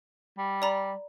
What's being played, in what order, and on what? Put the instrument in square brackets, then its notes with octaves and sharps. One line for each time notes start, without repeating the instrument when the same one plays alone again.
[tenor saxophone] G3
[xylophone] D5 A#5 B5